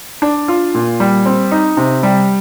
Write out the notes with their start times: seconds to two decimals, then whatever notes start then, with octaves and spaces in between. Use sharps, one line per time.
0.22 D4
0.48 F4
0.74 A#2
1.00 G3
1.26 C4
1.51 D#4
1.77 C3
2.03 G3